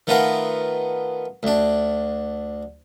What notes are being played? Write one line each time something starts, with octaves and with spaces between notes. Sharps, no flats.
D#3 A3 B3 F4 A#4
D2 D4